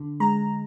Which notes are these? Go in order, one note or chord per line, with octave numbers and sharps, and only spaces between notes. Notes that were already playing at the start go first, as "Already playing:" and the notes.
Already playing: D3
G#3 A#5